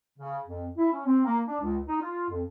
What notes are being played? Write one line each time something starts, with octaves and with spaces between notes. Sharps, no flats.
C#3
F2
E4
C#4
C4
A#3
D4
C#2
D#4
F4
F2